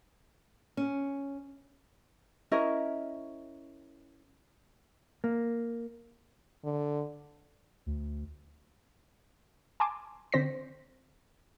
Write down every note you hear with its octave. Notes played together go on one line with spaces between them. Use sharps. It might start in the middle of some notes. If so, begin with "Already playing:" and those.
C#4
C#4 E4 A#4 D#5
A#3
D3
D2
G#5 A5 C6 D6
D3 C4 C5 A#6 B6